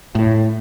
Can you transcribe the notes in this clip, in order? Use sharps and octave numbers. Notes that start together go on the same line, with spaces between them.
A2